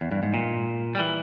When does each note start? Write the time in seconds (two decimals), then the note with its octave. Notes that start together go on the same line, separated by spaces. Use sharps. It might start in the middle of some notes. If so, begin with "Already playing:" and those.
0.01 E2
0.11 G2
0.23 G#2
0.34 A#2
0.95 G3
0.99 E3